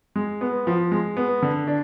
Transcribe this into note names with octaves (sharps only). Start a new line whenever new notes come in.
G#3
B3
F3
G#3
B3
D3
D4